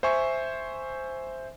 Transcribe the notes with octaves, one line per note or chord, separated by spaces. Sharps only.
C5 E5 G#5 C#6